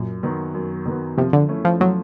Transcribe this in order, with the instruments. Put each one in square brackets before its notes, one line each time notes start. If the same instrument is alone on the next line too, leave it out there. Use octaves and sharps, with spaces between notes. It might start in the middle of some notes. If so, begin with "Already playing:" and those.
Already playing: [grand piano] F#2 [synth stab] A#2
[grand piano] D#3 F#3 B3
F#2
D#3 F#3 B3
[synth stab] C3 [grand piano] F3
[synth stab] D3
[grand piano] A3 C#4 E4
[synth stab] F3
[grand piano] F3 [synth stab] F#3